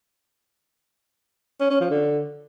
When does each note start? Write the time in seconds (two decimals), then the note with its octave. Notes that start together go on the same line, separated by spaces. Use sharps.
1.60 C#4
1.70 C#4
1.81 F3
1.91 D3